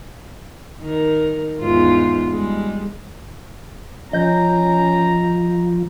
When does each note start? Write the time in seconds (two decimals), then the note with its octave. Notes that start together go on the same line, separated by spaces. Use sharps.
0.80 D#3 A#4
1.59 E2 G#2 F4
2.28 G3 G#3
4.13 F3 C#4 D#5 A#5 G6